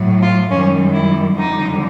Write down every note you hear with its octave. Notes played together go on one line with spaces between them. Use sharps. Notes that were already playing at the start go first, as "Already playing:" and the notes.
Already playing: A2 F#3
F4
F#2 D#3 G3 C#4
E4
F2 D3 G3 D#4